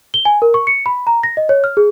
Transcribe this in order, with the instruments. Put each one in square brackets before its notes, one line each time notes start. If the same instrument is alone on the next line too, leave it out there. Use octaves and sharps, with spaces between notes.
[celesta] G7
G#5
A#4
C#6
C#7
B5
A#5
A#6
D#5
C#5
F6
G#4